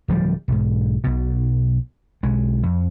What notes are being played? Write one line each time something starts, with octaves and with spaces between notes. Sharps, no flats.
D1 F3 G3
B1 G#2
B1 B2
B1 G#3
F2